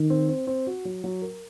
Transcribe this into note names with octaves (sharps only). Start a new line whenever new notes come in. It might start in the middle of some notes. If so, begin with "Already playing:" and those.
Already playing: D#3
C4
C4
C4
F#4
F#3
F#3
A#4